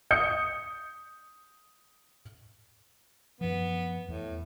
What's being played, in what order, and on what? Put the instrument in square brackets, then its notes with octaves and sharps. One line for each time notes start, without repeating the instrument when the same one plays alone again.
[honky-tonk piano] D#6 G6 C#7
[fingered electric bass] F#2 F3 [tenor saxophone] B3
[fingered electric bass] E2 [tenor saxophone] A2